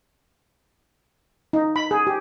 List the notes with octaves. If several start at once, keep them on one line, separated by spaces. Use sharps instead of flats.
D#4
B5
G#4
G4